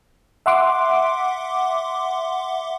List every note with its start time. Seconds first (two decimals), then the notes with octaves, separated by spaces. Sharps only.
0.46 E5 F#5 C6 D6